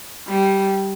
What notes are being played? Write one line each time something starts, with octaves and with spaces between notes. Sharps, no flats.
G3